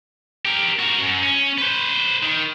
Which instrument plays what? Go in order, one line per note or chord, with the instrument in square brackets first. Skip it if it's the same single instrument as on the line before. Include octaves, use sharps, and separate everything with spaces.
[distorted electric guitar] G4 A#4
F#4 A#4
F#2
C#4
B4 C5
D#3